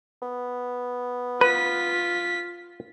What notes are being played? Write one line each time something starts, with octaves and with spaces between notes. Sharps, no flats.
B3
F4 B4 B6